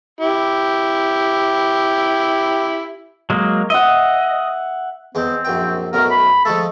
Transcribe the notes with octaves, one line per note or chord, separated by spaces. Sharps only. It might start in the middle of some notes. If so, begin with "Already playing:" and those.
E4 G4
F#3 G#3 A#3
D#5 E5 F#5
E2 G#3 C4
A#1 F#2 G5
B1 F#2 A2 A#4
B5
F3 G#3 A3 A4